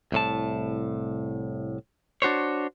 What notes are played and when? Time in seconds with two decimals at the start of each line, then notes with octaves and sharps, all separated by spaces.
0.12 C2 A2 A5
2.22 D4 F#4 C5 C#5